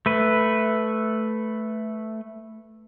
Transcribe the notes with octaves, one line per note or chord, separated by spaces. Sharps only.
A3 B4